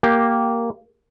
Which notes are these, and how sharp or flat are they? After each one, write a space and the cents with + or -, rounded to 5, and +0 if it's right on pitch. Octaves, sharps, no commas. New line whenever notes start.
A#3 +0 G4 +0